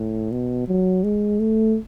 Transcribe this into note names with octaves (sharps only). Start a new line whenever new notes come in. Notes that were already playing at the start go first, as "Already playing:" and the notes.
Already playing: A2
B2
F#3
G#3
A3